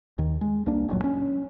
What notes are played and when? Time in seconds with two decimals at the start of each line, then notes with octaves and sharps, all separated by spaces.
0.18 D#2 D#3
0.41 G#3
0.66 C2 A#3 D4
0.88 F#1 C#2 A#2 F#3
1.04 C#4